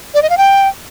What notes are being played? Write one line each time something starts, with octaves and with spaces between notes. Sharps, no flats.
D5
D#5
F5
G5